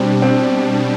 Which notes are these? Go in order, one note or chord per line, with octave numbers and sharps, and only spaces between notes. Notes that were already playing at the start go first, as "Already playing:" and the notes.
Already playing: B2 G3 C4 D4
C4